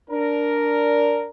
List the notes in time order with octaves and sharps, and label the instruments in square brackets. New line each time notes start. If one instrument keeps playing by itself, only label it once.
[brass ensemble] D4 A#4